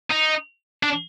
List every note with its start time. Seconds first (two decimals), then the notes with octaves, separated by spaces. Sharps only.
0.11 D#4
0.83 D4